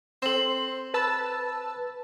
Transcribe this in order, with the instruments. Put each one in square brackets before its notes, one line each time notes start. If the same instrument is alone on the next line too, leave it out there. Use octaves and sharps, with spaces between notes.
[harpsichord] C4 [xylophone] A4 E7 [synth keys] C6
[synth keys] B4 A5 E6